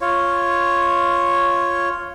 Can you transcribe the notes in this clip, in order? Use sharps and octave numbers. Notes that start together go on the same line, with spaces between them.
F4 C#5